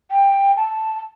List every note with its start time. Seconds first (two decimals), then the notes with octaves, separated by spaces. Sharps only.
0.10 G5
0.57 A5